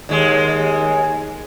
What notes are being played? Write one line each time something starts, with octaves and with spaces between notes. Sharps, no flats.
D#2 G#3